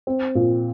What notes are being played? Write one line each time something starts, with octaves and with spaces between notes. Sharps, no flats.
C4
A#2